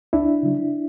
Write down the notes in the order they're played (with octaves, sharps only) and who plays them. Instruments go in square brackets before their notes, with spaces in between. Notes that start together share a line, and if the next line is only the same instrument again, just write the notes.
[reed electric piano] C#2 D4 E4
C#3 F#3